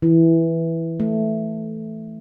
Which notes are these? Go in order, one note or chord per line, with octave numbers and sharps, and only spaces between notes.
E3
A3